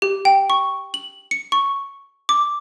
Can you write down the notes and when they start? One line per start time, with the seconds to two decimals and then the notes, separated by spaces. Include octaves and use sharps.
0.02 G4
0.25 G5
0.50 C#6
0.94 F#7
1.31 C#7
1.52 C#6
2.29 D6